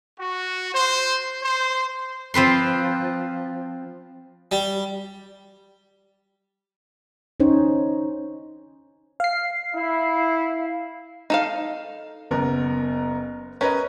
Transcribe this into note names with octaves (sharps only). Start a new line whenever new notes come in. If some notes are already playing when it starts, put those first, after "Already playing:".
F#4
C5
C5
F3 C4 B4 C6
G3
C#4 D#4 C5 C#5
F5 C7
E4
D#4 A4 F5
F#1 B3 A#4
C#4 A#4 B4 D#5